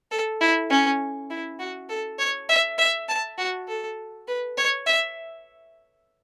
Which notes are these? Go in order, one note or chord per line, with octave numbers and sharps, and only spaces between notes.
A4
E4
C#4
E4
F#4
A4
C#5
E5
E5
A5
F#4
A4
B4
C#5
E5